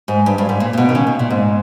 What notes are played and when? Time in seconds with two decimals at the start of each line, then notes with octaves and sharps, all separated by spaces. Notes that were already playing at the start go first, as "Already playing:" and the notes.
0.08 G#2
0.26 G2
0.38 G2
0.49 G#2
0.60 A#2
0.73 A#2
0.78 B2
0.89 D#3
0.95 C#3
1.07 B2
1.19 A#2
1.30 G#2